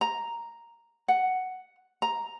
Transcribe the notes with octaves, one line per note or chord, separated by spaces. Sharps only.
A#5
F#5
A#5